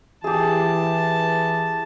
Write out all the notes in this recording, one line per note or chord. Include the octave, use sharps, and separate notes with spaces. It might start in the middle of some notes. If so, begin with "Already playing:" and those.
E3 G4 G#4 A5